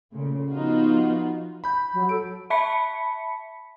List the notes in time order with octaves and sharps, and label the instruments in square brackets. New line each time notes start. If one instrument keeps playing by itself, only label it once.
[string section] A#2 C#3 A3
F3 B3 D#4 F4 F#4
[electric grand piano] B5 G6
[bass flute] F#3
[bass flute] A4 [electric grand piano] D7
[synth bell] E5 A5 B5 B6 C#7